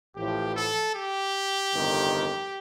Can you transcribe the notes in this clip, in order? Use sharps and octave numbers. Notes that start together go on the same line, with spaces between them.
A1 A2 F3 G4
A4
G4
G1 F2 C3 D#3